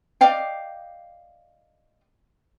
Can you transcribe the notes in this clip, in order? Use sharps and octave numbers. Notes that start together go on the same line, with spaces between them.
D5 D#5 F5 G5